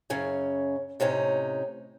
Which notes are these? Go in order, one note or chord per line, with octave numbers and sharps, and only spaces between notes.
F#2 C#3 C#4
A2 C3 C#4 D#4